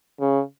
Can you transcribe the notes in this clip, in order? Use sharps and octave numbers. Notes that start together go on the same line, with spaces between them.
C#3